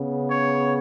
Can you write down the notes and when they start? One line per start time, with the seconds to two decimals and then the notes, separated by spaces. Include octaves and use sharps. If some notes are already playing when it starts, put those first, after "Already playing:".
Already playing: C#3 B3
0.31 C#5